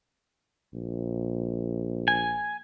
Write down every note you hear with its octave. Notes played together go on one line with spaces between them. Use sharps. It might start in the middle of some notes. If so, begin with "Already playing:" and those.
A#1
G#5